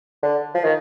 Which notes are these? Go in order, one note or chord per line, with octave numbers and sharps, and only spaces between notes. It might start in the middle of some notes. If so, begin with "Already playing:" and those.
D3
F3
D#3